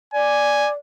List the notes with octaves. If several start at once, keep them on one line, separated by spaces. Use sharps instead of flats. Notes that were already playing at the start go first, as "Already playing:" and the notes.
D5 G#5